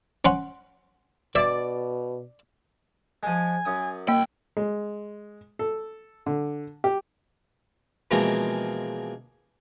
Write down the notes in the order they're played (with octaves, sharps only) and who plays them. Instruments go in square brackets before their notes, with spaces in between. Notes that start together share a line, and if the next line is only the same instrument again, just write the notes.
[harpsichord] C#4 F#5 C6
[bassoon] B2 [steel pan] D5 [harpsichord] E5
[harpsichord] F3 G#3 [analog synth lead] G#5
[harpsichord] F#2 D#6
[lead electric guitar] C2 G5 [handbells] A#3
[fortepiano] G#3
A4
D3
G4
[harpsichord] B2 E3 F3 G#3 A#3 C4